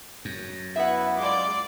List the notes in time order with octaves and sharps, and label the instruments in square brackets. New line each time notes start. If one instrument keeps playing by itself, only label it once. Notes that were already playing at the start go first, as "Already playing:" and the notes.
[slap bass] F#2
[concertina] B3 E4 [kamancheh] B4 [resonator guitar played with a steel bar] E5 F#5
[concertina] G#3 F4 C6 [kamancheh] D5 D6